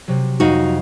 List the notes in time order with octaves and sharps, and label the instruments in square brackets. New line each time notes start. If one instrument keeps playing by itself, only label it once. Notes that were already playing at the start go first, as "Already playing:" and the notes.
[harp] C3 F#3
[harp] F2 F5 D#6 [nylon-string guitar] D#4 F#4